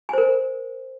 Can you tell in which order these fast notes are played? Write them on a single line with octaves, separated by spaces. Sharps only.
G#5 C5 A#4